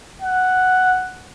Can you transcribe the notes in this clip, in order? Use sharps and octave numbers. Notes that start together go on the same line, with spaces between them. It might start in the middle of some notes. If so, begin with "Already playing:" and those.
F#5